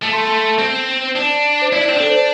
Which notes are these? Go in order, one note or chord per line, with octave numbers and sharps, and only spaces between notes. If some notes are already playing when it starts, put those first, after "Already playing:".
A3 A5
C6
A5
C6
A5
C4
D4
C5
E4 D5
D4
C4
D5
D4 A4
C5